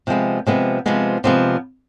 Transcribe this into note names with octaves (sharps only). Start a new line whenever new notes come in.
C3 F3 G#3 B3
C3 F3 G#3 B3
C3 F3 G#3 B3
C3 F3 G#3 B3